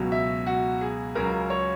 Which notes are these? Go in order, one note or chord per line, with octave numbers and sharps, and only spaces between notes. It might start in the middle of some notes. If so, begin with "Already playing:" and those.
Already playing: C#2 B2 F#3
E5
F#4
G#4
C#2 C#3 F#3 A#4
C#5